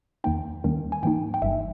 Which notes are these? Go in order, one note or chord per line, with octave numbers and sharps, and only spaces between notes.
E2 D#3 A#3 D#4 G5
D#2 D#3 G3 A#3 C#4
G#5
G#2 E3 A#3 D#4 G5
G5
G1 G2 G3 E5